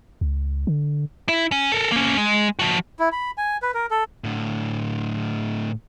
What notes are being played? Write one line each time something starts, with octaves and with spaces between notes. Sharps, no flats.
C#2
D3
E4
C#4
A4 A#4
A#3 C#4
G#3
F3 F#4
E4
B5
G#5
B4
A#4
A4
A2 D3